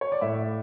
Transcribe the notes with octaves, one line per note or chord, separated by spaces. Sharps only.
C#5
D5
A2 E5